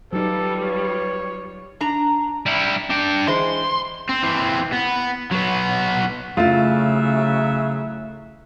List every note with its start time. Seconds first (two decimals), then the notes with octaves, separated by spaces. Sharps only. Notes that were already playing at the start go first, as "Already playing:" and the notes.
0.13 F#3 G3 D#4 F4 A4 B4
0.62 C#5
1.81 D4 A#5
2.46 G3 E4
2.90 D4 G5
3.27 E3 G#3 C5 C6
4.09 C4
4.23 E3 C4
4.73 B3
5.31 F#3 B3
6.37 C#3 F#3 A3 E4 F4 E5